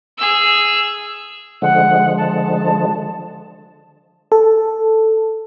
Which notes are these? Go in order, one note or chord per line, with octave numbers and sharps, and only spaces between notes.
G#4 E6
D3 F3 G#3 F#5
A5
A4